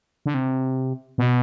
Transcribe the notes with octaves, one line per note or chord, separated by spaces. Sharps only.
D3
C3
B2